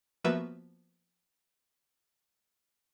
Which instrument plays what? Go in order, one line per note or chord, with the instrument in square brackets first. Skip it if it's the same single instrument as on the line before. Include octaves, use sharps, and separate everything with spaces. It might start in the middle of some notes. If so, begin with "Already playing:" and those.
[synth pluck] F3 A#3 B3 F#4 B4 E5